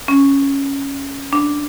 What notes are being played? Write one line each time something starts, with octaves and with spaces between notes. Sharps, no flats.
C#4
D4